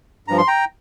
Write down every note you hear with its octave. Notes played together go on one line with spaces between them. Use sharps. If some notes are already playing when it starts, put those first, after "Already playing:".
G2 F3 A#5
C6
G5 A#5